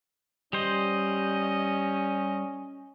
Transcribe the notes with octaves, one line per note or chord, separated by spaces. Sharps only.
G3 C#4 C5 D#5